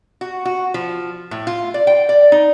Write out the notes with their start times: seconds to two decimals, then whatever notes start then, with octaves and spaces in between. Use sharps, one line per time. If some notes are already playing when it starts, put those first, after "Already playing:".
0.21 F#4
0.45 F#4
0.74 F3
1.31 A2
1.47 F4
1.74 D5
1.87 G5
2.09 D5
2.32 D#4